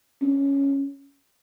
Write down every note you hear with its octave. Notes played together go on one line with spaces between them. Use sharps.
C#4